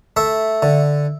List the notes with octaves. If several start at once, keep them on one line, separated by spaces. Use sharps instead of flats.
A3 E5
D3